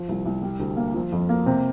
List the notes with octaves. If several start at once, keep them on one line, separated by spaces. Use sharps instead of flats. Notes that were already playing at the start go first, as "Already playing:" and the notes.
Already playing: F3
C2
C2
G3
D2
A#3
F3
F2
A#3
C3